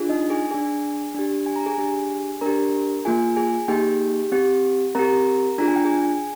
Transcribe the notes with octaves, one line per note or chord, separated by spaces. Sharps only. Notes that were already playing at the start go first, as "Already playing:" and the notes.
Already playing: D4 F4 G#4
D#4 D#5
G#4 G#5
D4 G#4 G#5
D4 G4
G#5
A#5
G#4 G#5
D4 G4
D4 G4 A#4 A#5
A#3 F4 G#4 G#5
G#4 G#5
A#3 D#4 G4 G#4 G5
C4 G4
C4 G4 A#4 A#5
D4 F4 G#4 A#5
G#5
G5
G#4 G#5